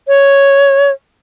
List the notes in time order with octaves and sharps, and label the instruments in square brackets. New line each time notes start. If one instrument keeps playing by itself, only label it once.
[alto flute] C#5